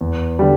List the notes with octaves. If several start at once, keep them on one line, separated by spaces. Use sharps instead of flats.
E2
D3 G3